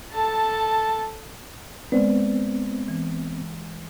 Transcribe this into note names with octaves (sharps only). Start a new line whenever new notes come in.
A4 A5
G#3 B3 C4 D5
E3